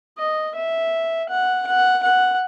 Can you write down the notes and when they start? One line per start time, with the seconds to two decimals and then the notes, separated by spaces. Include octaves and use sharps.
0.18 D#5
0.56 E5
1.30 F#5
1.67 F#5
2.03 F#5